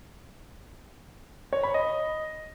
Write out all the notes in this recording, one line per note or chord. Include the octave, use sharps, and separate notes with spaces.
C#5
B5
D#5